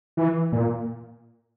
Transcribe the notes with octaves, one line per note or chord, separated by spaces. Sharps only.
E3
A#2